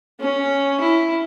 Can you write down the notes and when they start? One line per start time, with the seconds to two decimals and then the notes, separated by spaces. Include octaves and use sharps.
0.20 C#4
0.80 E4